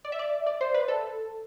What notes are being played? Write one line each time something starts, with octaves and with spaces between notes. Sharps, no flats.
D5
E5
D5
D5
C5
B4
A4